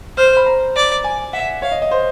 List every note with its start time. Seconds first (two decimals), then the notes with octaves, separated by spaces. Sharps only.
0.17 C5 F6
0.28 F6
0.37 B5
0.46 A#5
0.76 D5
1.04 G#5
1.33 E5 F#5
1.62 C#5 F5
1.72 D#5
1.82 D#5
1.91 C5